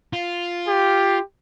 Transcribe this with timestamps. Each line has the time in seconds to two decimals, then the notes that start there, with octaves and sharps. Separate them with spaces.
0.13 F4
0.68 G4